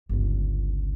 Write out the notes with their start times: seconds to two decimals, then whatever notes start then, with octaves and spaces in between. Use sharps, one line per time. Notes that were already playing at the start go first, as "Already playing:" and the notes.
0.09 G1 C#2